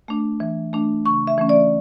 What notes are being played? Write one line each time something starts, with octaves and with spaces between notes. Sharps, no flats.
A3 D4
E3
A3 D4
C#3 C#6
E5
E3 A3 C#4
D5